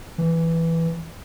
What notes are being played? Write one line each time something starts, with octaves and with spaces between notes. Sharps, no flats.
E3